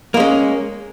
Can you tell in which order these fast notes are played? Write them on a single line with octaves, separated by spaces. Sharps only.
A#3 G#3 C#4